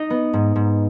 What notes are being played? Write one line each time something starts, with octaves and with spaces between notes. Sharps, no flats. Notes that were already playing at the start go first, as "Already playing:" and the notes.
Already playing: D#4 D#5
B3
G#2
G#2